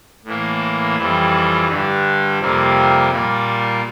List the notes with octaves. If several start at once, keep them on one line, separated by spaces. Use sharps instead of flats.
A2 E3 A#3
F2 E3 G3
G2 D3 G3
F2 C3 G3 A#3
A#2 G3 A#3